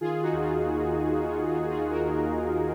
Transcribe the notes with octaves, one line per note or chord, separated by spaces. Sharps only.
D#3 F4 G#4
F4
D#4 F#4
D#2
F4
A#3
D#3
D#2 F4
F4
D#2
F4 G#4
A#3 F#4 A#4
D#2